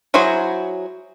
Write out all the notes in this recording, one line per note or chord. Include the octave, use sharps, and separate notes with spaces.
F#3 E4 F#4 G#4 C5